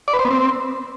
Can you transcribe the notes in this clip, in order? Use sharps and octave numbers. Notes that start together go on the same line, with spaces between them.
D5
B4
C5
B3
C4